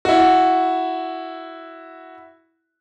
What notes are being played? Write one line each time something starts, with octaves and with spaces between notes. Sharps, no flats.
E4 F#4